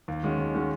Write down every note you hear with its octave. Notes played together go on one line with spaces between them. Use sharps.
D#2
D#3 G#3 C#4 F#4
D#2
D#3 G#3 C#4 F#4